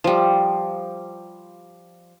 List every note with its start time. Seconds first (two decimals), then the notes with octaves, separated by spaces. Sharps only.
0.04 F3 G3